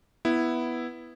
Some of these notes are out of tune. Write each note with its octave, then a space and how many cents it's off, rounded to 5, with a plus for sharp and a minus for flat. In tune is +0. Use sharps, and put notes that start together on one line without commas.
B3 +0 E4 +0